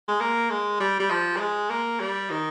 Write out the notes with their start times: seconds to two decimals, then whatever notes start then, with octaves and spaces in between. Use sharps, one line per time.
0.08 G#3
0.21 A#3
0.50 G#3
0.80 G3
1.00 G3
1.10 F3
1.36 G3
1.40 G#3
1.70 A#3
2.00 G3
2.30 D#3